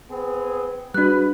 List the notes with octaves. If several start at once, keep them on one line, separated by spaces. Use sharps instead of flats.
B3 C4 G#4
G#2 G3 D4 F#4 B4 F#6